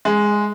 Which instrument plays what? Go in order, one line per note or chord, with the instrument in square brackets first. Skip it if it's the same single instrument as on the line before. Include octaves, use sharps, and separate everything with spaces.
[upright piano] G#3